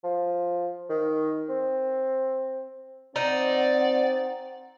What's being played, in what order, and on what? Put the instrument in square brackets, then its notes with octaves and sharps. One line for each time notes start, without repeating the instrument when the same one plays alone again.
[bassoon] F3
D#3
C4
[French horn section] C4 [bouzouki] D#4 [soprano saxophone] D5 [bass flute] F#5